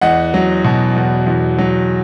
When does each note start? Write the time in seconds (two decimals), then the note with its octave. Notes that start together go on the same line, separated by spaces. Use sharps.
0.01 E2 D#5 F#5
0.34 F#3
0.64 B2
0.96 E2
1.26 E2
1.58 F#3